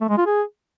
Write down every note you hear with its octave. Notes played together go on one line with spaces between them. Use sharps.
A3
G#3
F4
G#4